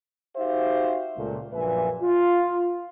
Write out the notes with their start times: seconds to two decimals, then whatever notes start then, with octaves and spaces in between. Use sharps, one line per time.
0.36 D#4 F#4 G4 C5 E5 F5
1.17 C#2 A#2 A3
1.53 A#1 F#2 A#2 B4 E5 G#5
2.02 F4